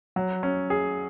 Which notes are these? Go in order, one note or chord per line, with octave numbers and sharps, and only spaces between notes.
F#3
C#4
G#4